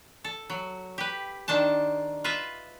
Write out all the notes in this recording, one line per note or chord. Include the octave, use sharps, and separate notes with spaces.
A4
F#3
G4 B4
D#3 D4 C5 A5
F4 B4 D#5 E5